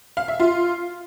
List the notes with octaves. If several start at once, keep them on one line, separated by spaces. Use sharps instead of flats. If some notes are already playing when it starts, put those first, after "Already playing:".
F5
E5
F4